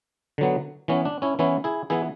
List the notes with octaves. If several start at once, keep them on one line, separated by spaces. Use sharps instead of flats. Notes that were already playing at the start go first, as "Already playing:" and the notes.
D3 F#3 B3
E3 B3 C#4
D4
C#4 E4
E3 B3 C#4 E4
E4 G#4
E3 B3 E4 G#4